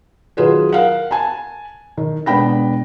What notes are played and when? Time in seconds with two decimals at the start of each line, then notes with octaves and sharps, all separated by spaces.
0.37 D#3 F#3 F4 G#4 B4
0.73 A#4 F5 F#5
1.11 G#5 A5
1.97 D#3
2.26 E1 B3 D4 G5 B5 A#6